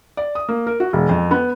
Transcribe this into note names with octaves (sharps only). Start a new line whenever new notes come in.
D5
D#6
A#3
A#4
F#4
E1
F2
B3